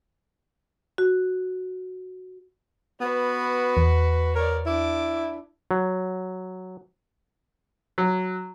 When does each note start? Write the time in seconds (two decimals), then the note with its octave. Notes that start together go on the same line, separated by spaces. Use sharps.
0.98 F#4
3.01 B3 F#4 B4
3.77 E2
4.36 A#4 C#5 D5
4.66 D4 E4 D6
5.71 F#3
7.98 F#3